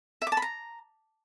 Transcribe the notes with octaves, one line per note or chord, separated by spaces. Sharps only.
E5
D6
A5
B5
A#5